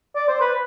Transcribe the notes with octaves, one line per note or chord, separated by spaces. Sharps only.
D5
C5
B4